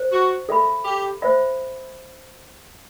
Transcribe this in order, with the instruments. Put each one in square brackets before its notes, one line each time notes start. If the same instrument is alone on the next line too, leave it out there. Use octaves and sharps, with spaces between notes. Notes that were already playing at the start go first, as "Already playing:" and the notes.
Already playing: [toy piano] C5
[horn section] F#4
[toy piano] A4 E5 B5
[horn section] G4
[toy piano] C5 E5 B5